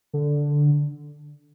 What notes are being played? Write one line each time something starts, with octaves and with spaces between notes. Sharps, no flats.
D3